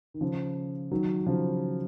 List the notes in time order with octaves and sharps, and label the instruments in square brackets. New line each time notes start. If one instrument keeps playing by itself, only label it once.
[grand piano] D#3
C#3 F3
D#3 F#3
C#3 F3